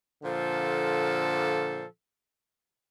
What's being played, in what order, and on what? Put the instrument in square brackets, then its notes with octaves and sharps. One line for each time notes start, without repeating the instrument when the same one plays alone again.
[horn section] A#2 D3 F3 A4